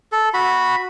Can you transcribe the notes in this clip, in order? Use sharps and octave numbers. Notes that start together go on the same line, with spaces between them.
A4
F#4 B5